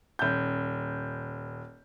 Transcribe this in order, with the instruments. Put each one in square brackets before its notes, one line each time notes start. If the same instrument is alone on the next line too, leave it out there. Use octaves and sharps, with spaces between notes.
[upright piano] D#1 G6